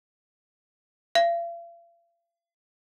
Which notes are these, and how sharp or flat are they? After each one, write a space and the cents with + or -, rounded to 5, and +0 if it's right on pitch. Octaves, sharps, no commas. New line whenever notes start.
F5 -45